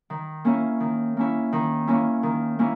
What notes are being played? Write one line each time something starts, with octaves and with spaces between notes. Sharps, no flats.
D#3
A#3 C#4 E4
D#3
A#3 C#4 E4
D#3
A#3 C#4 E4
D#3
A#3 C#4 E4